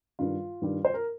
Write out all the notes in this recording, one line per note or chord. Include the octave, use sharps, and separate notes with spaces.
G2 D#3 G3 F4
G2 D#3 G3
C5
A#4